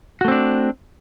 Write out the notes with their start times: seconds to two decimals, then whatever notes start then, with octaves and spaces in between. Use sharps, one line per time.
0.21 F#4
0.25 A3
0.28 C4
0.32 D4